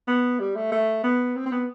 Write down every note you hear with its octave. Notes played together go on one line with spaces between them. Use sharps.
B3
G3
A3
A3
B3
C4
C4
B3